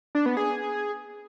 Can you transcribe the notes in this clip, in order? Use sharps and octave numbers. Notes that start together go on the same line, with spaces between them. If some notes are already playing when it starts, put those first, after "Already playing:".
D4
B3
G#4